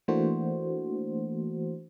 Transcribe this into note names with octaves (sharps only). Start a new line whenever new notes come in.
E3 A3 A#3 D4 F#4 C5